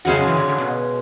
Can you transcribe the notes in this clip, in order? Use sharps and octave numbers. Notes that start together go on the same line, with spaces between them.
E2 C#3 G#3 C#4 F#4
F#2
E3
D3
D3
B2